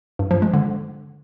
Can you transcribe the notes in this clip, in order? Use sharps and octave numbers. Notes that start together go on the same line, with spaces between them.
G2
F3
G#3
D3